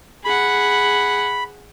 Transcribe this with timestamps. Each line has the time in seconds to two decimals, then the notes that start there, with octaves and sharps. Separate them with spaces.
0.25 G#4 F#5 B5